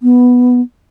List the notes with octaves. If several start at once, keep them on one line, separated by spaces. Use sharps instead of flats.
B3